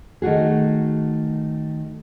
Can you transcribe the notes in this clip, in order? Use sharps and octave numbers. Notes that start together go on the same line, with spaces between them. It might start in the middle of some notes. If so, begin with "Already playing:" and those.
D#3 A3 F#4 G#4